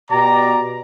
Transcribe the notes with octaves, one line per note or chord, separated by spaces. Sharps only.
B2 G4 D5 A#5